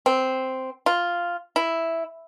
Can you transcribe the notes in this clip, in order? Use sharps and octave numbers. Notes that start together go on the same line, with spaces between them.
C4
F4
E4